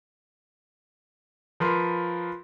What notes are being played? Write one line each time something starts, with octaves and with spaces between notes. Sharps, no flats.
F3 A#4 B4 C6